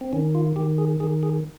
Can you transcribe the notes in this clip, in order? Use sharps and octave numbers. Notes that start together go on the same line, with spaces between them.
C4
D#3 C#4
F4
D#3 G4
G#4
D#3 G#4
G#4